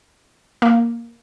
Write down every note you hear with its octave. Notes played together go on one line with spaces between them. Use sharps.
A#3